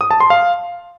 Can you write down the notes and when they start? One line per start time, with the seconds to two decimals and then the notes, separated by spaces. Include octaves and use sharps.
0.01 D#6
0.11 A5
0.20 C6
0.30 F5